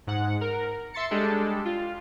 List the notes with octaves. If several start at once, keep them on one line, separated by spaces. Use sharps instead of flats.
G#2 F#5
A#4
E5 C6 A6 C#7
G3 G#3 D4 G4 A4
F4